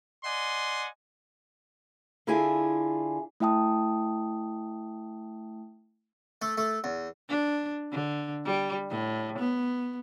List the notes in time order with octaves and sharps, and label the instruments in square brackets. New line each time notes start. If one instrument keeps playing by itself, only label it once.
[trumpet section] D5 D#5 F#5 G#5 C6
[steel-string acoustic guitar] D3 E4 F4 G#4 E5 G#5
[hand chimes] A3 E4 E5 G5 A5 D#6
[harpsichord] A3
A3
E2
[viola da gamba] D4
D3
G3
A2
B3